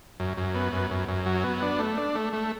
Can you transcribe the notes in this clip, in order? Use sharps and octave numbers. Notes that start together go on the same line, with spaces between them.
F#2
F#2
B3
F#2
F#2
F#2
F#3
B3
D4
A3
D4
A3
A3